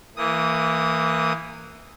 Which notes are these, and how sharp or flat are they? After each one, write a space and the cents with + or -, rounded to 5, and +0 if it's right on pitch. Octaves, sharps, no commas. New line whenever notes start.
E3 +0 A#3 -25 D#6 +0